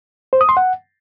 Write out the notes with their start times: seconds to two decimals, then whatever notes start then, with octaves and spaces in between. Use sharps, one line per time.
0.33 C5
0.41 D#6
0.49 C6
0.57 F#5